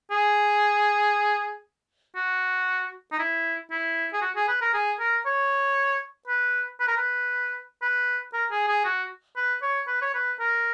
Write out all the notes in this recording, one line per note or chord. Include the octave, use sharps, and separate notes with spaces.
G#4
F#4
D#4
E4
E4
G#4
F#4
G#4
B4
A#4
G#4
A#4
C#5
B4
B4
A#4
B4
B4
A#4
G#4
G#4
F#4
B4
C#5
B4
C#5
B4
A#4